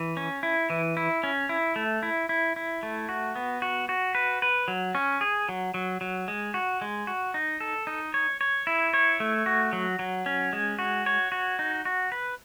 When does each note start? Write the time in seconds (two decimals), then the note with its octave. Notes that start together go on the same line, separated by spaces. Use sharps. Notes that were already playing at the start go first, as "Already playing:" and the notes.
Already playing: E3
0.17 C#4
0.43 E4
0.70 E3
0.97 E4
1.23 C#4
1.49 E4
1.76 A3
2.03 E4
2.29 E4
2.56 E4
2.83 A3
3.09 F#4
3.36 B3
3.62 F#4
3.89 F#4
4.15 B4
4.42 B4
4.68 F#3
4.95 C#4
5.21 G#4
5.49 F#3
5.74 F#3
6.01 F#3
6.28 G#3
6.54 F#4
6.81 G#3
7.07 F#4
7.34 D#4
7.61 A4
7.87 D#4
8.14 C#5
8.41 C#5
8.67 E4
8.94 C#5
9.20 A3
9.46 F#4
9.73 F#3
9.99 F#3
10.26 C#4
10.53 G#3
10.79 F#4
11.06 C#5
11.32 F#4
11.59 D#4
11.85 F#4
12.12 B4